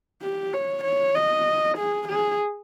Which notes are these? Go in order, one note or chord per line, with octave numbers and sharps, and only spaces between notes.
G4
C#5
C#5
D#5
G#4
G#4